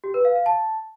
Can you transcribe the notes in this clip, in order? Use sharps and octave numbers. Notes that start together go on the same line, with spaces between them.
G4
B4
F5
F5
A5